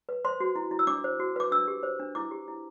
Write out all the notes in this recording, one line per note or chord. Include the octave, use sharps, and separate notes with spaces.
B4
C5 C6
F#4
E4
E4
E6
D4 D6
C5
F#4
B4 D6
D4 E6
G4
C5
D4
E4 D6
G4
E4